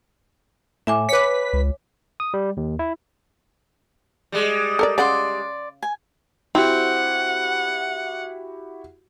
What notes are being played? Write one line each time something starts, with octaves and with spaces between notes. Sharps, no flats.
A2 E5 G#5 D6
B4 C#5 D6 B6
C#2
D#6
G3
D#2
E4
G3 G#3
A4 A#4 D5
C#3 D5 F#5 C6
G#5
C4 E4 F#4 G4 F#5